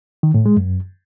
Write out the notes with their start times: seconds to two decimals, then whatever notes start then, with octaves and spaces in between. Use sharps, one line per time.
0.23 D#3
0.34 A2
0.46 G#3
0.57 F#2